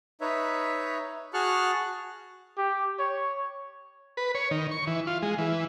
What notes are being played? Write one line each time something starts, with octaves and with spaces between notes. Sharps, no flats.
D#4 B4 C#5 E5
F#4 G#4 A5 C#6 F6 F#6
G4
C#5
B4
C#5
D#3
C#6
E3
F4
G#3
E3